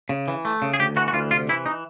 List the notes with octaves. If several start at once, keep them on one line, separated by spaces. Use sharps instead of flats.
C#3
E3
A3
C#3
G#4
D2 G4
E3 F#4
F#4
D2 F4
C3 F4
E3 E4
D#4